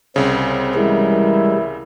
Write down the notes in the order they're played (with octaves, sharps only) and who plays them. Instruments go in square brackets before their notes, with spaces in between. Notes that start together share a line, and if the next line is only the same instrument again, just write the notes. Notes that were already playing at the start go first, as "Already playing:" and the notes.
[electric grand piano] C2 C#3 [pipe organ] C4
[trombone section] E3 E4 [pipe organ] G3 G#3 [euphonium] A#4